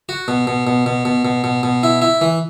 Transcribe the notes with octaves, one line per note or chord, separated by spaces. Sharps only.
F#4
B2
B2
B2
B2
B2
B2
B2
B2
E4
E4
E3